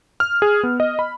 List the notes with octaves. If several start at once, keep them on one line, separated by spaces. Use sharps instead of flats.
F6
G#4
B3
D#5
B5